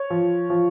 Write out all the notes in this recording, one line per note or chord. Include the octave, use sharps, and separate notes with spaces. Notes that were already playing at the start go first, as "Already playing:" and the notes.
Already playing: C#5
F3
F3